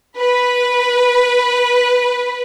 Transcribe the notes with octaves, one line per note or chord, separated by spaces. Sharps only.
B4